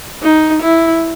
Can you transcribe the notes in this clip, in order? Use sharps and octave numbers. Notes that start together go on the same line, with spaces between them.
D#4
E4